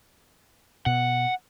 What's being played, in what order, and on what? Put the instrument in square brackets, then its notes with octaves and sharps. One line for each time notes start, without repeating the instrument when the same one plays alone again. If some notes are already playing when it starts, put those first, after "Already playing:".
[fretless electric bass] B2 [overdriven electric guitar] F#5